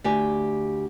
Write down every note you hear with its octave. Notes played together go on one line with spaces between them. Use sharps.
D2 G4 G#5